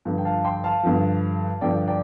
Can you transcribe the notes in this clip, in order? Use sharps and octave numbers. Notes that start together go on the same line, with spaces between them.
G2 D3 F3
G5
F5 A5
G5 C6
F5 A5
G2 D3 F3
G2 D3 F3 D5 G5
D5 G5